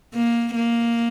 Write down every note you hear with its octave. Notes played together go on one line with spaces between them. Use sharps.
A#3
A#3